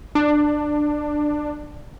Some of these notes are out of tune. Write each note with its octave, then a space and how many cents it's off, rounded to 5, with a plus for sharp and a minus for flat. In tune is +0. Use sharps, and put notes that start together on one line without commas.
D4 +15